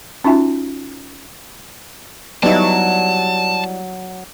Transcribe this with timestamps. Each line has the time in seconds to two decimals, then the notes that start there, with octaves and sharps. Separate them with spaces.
0.24 C#4 D#4 F4 F#4 E5 G#5
2.43 F#3 G3 B3 D#4 E4 A5